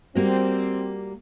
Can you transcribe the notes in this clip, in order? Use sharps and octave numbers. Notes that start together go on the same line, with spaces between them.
G3 A#3 C4 F#4